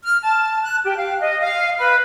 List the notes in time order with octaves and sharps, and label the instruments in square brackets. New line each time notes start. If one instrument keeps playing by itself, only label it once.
[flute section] F6
A5
F#6
G4
F5
D#5
F5
B4